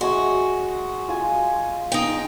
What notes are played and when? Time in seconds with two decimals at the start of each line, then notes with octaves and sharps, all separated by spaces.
0.01 G#3 F#4 E5 C#6
1.08 F4 G#5
1.92 D#4 G5